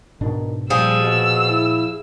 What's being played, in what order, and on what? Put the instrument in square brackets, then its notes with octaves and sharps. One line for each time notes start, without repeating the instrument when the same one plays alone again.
[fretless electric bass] G#2 B2 D4 [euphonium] D#3
[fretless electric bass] A#2 [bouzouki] F3 G#4 [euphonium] G3 [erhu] E6
[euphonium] B2
E4